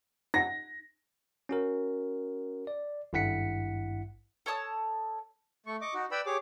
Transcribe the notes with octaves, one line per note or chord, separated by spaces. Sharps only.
D#4 F#5 A#6
C#4 F#4 A#4
D5
G#1 G2 E4 F#5 B6 C#7
A4 C#5 A5 D#6
A3 C#6
D#5 C#6 D6
D#4 F#4
B4 D5 G5 B5 E6
G4 G#4 C#5 D6